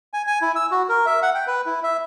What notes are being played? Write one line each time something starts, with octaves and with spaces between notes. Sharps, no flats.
G#5
G#5
E4
E6
F#4
A#4
E5
F#5
G5
B4
E4
E5